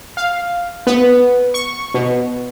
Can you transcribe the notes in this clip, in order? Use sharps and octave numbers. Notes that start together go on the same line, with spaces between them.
F5
B3
C#6
B2